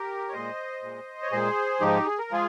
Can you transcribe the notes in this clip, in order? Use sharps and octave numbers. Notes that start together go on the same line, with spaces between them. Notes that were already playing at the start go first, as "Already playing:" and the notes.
Already playing: G4 A#4
C#5
A#2 G#3 C5 D#5
A#2 G#3
C#5
A#2 G#3 G#4 C5
G#2 F3 G#3 D#4 G4
G#4
A#4
F3 G#3 F4 G#4